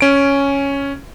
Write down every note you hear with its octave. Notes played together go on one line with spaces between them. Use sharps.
C#4 D7